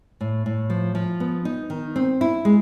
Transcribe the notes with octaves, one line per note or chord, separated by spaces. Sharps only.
A2
A2
F3
F3
B3
D#4
D#3
C4
E4
G#3